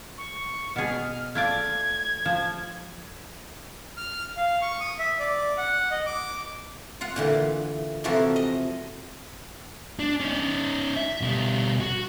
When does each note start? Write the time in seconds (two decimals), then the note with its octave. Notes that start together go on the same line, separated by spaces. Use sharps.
0.18 C#6
0.76 B2 G#4 F6
1.35 A3 F4 D5 G#6
2.25 F3
3.97 F6
4.37 F5
4.62 C#6
4.80 D#6
4.99 E5
5.20 D5
5.58 F#5
5.91 D#5
6.06 D6
7.01 F4 F5 F#5
7.16 A#2 D3 E3
8.04 C3 E3 F3 F#4 A4 A#4
8.36 D#5
9.99 D4
10.20 C#4 D#4
10.96 E5
11.21 B2 G3
11.80 F#4